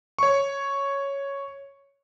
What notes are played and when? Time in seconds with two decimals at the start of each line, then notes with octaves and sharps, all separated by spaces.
0.19 C#5 C#6